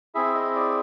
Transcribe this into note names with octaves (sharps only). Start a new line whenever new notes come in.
C4 E4 G#4 E5
D#5
D5